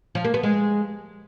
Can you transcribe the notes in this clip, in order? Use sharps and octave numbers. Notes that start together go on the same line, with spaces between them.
F3
A#3
B3
G#3